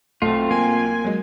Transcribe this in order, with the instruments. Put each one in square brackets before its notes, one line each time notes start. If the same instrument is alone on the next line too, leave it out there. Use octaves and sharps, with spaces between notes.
[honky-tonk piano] B1 [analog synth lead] A3 [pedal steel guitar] C4 F4
[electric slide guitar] A#3 [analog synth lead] G#5
[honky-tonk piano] F#3 G#3